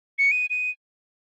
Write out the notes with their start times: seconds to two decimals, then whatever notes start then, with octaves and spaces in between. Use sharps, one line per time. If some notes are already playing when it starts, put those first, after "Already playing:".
0.19 C#7
0.31 D#7
0.50 D#7